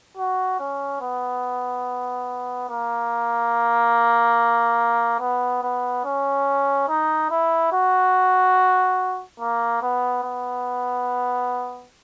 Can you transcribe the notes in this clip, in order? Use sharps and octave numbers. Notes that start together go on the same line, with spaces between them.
F#4
C#4
B3
A#3
B3
B3
C#4
D#4
E4
F#4
A#3
B3
B3